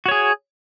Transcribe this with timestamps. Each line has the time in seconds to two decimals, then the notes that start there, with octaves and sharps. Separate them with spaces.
0.06 F#4
0.08 C#5
0.11 G#4